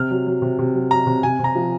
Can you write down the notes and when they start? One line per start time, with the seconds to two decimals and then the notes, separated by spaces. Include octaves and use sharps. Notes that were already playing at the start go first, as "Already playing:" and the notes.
Already playing: C3 F6
0.10 F#3
0.26 F#3
0.42 C3
0.59 C3
0.75 F#3
0.91 F#3 A#5
1.07 C3
1.23 C3 G#5
1.39 C3 A#5
1.55 F3